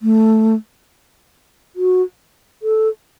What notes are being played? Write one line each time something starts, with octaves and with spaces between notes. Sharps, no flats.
A3
F#4
A4